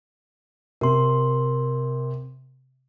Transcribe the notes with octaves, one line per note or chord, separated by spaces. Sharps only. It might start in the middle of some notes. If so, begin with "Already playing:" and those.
C3 A#4 C6